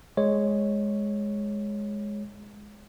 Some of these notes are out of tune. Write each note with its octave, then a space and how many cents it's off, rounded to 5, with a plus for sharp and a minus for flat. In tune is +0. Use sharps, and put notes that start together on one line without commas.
G#3 +0 C#5 -5